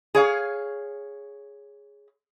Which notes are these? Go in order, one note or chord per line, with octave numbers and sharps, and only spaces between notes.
G#4 C#5 F5